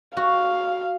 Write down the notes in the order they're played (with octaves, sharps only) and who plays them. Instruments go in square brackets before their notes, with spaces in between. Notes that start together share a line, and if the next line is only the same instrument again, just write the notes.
[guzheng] F#4 [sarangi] F5